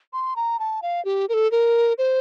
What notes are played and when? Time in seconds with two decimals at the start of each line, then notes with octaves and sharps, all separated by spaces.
0.13 C6
0.36 A#5
0.59 A5
0.82 F5
1.05 G4
1.29 A#4
1.34 A4
1.51 A#4
1.98 C5